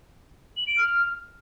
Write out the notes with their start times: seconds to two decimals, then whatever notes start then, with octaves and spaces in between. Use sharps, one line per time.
0.57 F#7
0.67 D7
0.78 F6